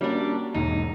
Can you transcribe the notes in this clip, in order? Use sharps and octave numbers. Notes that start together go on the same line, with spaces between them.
G3 A#3 C#4 D4 F#4
E1 G#2 D#4